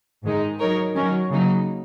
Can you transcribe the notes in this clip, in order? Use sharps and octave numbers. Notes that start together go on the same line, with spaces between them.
G#2 D#3 G#3 D#4
F#3 D#4 A#4 C#5
D#3 F#3 C#4 A#4 C#5
C#3 F#3 A#3 D#4